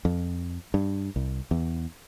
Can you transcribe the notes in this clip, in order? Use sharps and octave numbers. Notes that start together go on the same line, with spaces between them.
F2
G2
C2
E2